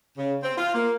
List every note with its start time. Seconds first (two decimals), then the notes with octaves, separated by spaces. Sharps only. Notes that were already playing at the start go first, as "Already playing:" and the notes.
0.17 C#3
0.43 C4
0.58 F4
0.74 A#3